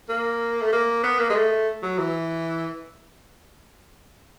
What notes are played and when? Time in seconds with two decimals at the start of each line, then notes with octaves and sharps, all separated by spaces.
0.09 A#3
0.62 A3
0.73 A#3
1.04 B3
1.19 A#3
1.30 G#3
1.35 A3
1.83 F#3
1.98 E3